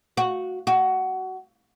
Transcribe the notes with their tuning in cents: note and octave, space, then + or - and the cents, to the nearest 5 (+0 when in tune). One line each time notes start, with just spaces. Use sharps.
F#4 -5
F#4 +20